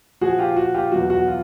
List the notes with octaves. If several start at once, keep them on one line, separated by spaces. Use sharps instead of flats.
A#2 F3 F#4 G#4
F4 G4
F#4
F4 G4
E2 B2 F#3 F#4
F#4
F4